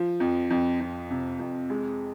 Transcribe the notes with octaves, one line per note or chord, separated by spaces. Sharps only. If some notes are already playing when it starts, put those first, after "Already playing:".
Already playing: F3
F2
F2
F2
C3
F2
G#3